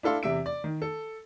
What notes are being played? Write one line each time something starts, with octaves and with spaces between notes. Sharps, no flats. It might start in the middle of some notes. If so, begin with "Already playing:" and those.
D4 E4 A4 F5 C6
E2 C3 E5 D7
D5
D#3
A4